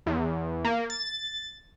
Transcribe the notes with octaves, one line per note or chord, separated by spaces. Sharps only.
E2
A#3
A6